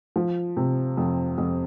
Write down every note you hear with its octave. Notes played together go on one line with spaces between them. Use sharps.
F3
C3
F2
F2